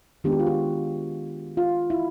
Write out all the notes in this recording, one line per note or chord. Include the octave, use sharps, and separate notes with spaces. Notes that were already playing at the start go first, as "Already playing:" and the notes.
D#3 G#3 B3 D4 G4
F#4
F4
F#4
F4
E4